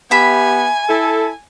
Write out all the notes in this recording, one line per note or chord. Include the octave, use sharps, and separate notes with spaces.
B3 G4 E5 G#5 B5
E4 A4